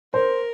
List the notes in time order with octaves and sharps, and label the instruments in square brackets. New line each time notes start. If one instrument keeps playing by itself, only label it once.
[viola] A#4 [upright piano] C5